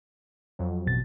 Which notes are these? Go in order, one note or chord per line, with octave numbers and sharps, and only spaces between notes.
F2 F#3
A1 B2 A6